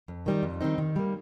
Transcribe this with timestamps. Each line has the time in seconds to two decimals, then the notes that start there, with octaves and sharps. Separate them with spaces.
0.08 F2
0.26 D#3 G3 C4 D#4
0.43 F2
0.61 D#3 G3 C4 D#4
0.78 D#3
0.96 G3 A#3